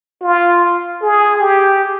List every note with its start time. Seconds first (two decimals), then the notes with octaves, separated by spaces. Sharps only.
0.22 F4
1.02 G#4
1.40 G4